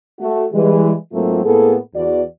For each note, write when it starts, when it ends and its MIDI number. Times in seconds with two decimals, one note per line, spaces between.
0.20 0.45 57
0.20 0.45 66
0.53 0.93 52
0.53 0.93 55
0.53 0.93 56
1.13 1.42 44
1.13 1.42 54
1.13 1.42 57
1.13 1.42 58
1.13 1.42 60
1.13 1.42 65
1.44 1.76 45
1.44 1.76 58
1.44 1.76 59
1.44 1.76 68
1.44 1.76 69
1.94 2.22 40
1.94 2.22 66
1.94 2.22 74